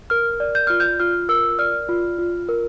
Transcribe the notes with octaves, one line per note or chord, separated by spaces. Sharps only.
A#4 F6
D5
G6
F4 F6
G6
F4 F6
A#4 E6
D5 F6
F4
F4
A#4